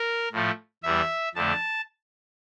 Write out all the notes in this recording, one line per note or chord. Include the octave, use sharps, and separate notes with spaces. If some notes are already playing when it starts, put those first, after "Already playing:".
Already playing: A#4
A2 F3 A3
E2 E3 G3 E5
F2 D3 A3 A5